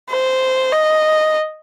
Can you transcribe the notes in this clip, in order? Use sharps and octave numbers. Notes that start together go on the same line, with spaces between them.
C5
D#5